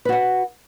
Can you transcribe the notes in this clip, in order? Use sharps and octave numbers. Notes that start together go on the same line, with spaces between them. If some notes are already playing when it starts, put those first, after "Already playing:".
F#4 B4 F#5